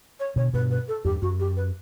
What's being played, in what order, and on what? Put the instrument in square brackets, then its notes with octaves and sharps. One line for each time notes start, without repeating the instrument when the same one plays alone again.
[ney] C#5
[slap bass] B2 D3 [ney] C#5
[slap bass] G2 B2 [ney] B4
[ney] B4
A4
[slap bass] E2 G2 [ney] G4
[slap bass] F#2 [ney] F#4
[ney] G4
B4